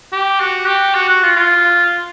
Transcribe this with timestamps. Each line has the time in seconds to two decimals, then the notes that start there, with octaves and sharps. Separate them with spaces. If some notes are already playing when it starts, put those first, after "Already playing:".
0.12 G4
0.40 F#4
0.68 G4
0.95 F#4
1.09 F#4
1.23 F4
1.36 F4